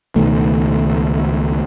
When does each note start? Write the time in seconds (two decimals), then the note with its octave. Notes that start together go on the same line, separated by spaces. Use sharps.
0.16 C#2 B2 D#3 A3